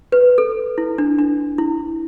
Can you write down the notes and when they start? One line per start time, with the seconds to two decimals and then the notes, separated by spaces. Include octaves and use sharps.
0.12 B4
0.38 A4
0.78 E4
0.98 D4
1.19 D4
1.58 E4